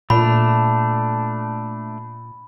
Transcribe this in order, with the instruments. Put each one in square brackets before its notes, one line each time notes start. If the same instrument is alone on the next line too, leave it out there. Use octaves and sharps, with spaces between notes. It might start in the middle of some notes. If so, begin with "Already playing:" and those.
[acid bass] A#2 [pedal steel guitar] A3 D4 [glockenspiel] B5